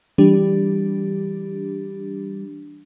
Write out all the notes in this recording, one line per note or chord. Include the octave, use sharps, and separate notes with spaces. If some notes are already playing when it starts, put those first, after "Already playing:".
E3 G3 D4 G4